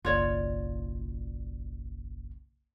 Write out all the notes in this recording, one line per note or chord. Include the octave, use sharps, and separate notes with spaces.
F#1 B1 F4 C#5 D5